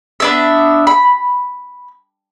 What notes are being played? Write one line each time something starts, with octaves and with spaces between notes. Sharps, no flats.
B3 D4 E5
B5